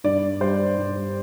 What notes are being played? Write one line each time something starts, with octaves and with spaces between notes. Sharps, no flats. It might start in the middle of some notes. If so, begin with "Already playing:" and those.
G2 D5
G3 C5
G2